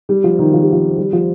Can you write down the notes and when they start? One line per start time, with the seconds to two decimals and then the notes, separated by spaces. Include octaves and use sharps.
0.09 G3
0.24 F3
0.39 D#3
0.54 F3
0.63 G3
0.72 F3
0.98 G3
1.13 F3